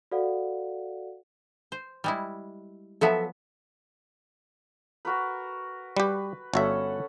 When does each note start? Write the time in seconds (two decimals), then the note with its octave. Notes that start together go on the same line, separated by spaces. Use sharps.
0.11 F#4 A4 C5 D5 F5 F#5
1.72 C5
2.04 G3 G#3 E4
3.01 F3 F#3 B3 A4 E5 A5
5.05 F#4 A#4 B4
5.97 G3 G4 B4
6.54 G1 C#4 F#4 A4 E5 F#5